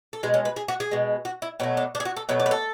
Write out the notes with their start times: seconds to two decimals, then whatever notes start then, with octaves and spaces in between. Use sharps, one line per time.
0.13 A4
0.23 B2 G#3 G#4
0.34 C#4
0.45 B4
0.56 G#4
0.68 F#4
0.80 G#4
0.91 B2 G#3
1.25 F#4
1.42 E4
1.60 B2 F#3 A3 C#4
1.77 D4
1.95 D4
2.00 G#4
2.05 F#4
2.17 A4
2.29 B2 F#3 A3 B4
2.40 D5
2.46 B4
2.51 A4